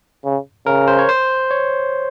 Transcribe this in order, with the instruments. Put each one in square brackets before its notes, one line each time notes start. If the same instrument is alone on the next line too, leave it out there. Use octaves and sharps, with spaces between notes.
[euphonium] C#3
[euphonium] C#3 [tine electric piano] A#4
[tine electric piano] C5
C#5
C5
C#5